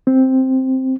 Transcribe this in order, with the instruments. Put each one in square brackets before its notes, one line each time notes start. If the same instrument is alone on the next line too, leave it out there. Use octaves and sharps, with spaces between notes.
[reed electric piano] C4